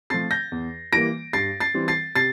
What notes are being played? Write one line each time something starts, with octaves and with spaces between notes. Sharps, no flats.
F3 A3 C4 A6 C7
G6 A#6
E2
E3 G3 A#3 A#6 D7
G2 A6 C7
A6 C7
E3 G3 C4
A6 C7
C3 A6 C7